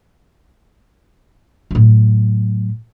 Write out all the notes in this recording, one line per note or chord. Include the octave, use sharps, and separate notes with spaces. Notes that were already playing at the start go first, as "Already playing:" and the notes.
A2 F#3